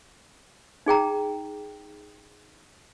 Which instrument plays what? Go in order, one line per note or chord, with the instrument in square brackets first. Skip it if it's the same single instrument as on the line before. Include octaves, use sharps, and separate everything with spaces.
[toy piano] D#4 G#4 G5 A#5